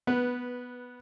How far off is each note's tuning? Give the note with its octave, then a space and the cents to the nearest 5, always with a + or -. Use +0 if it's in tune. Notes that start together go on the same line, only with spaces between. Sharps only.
B3 +0 B4 -10